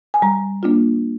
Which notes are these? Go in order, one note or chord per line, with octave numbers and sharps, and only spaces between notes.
G#5
G3 A#5
A#3 D4 F4